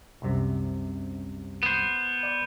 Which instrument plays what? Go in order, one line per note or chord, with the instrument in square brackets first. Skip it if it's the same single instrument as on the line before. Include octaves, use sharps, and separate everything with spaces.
[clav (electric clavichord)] C2 F#2 C3
[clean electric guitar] B3 C5
[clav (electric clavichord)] D5